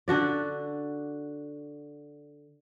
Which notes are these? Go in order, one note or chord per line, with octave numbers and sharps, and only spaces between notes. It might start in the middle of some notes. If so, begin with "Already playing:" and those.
D3 D4 F#4 D5